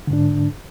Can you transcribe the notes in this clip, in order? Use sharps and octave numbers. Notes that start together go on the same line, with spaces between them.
G#2 D3 D4